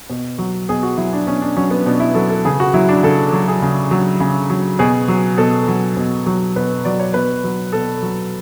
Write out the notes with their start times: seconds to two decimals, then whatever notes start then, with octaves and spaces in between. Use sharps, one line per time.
0.10 B2
0.38 F#3
0.69 B2 G#4
0.83 F#4
0.97 F#3 E4
1.13 D4
1.27 B2 C#4
1.42 D4
1.57 F#3 C#4
1.71 B3
1.86 B2 D4
2.00 E4
2.15 F#3 A4
2.30 A4
2.45 C#3 G#4
2.60 F#4
2.74 F#3 E4
2.89 D4
3.03 C#3 A4
3.32 F#3
3.48 G#4
3.62 C#3
3.91 F#3
4.20 C#3
4.50 F#3
4.79 B2 G#4
5.08 F#3
5.38 B2 A4
5.68 F#3
5.97 B2
6.26 F#3
6.56 B2 B4
6.85 F#3 D5
7.00 C#5
7.14 B2 B4
7.44 F#3
7.73 B2 A4
8.02 F#3